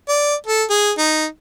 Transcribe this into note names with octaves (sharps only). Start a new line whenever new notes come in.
D5
A4
G#4
D#4